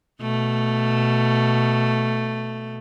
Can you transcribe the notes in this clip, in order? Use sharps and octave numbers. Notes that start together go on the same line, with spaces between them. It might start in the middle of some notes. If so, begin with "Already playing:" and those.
B2 A3